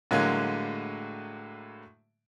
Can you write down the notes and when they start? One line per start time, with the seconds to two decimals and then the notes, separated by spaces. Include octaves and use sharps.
0.11 A2 D3 F#3 G#3 A#3